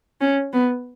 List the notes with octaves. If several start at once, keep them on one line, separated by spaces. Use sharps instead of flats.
C#4
B3